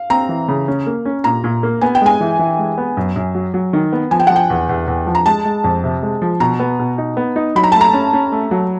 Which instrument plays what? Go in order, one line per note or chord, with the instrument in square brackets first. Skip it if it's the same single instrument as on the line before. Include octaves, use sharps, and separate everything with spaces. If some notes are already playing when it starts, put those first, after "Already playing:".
Already playing: [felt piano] F5
[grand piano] C4 [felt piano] A#5
[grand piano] E3
C#3
C#4
A#3
C#4
[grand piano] A#2 [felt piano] A#5
[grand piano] A#2
A#3
[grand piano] B3 [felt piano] G#5
[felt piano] G5
[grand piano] G#3 [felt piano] G#5
[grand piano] E3
E3
G#3
B3
F#2
F#2
F#3
F#3
D#3
B3
[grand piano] F3 [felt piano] G#5
[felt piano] G5
[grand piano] F3 [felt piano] F#5
[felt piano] G5
[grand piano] E2
E2
E2
F3
[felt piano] A#5
[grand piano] G#3 [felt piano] A5
[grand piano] G#3
F2
C3
G#3
F3
[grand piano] B2 [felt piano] A#5
[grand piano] B3
B2
D#4
B3
D#4
[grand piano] F#3 [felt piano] B5
[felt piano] A#5
[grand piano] A3 [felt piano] A5
[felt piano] A#5
[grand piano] C#4
C#4
A3
F#3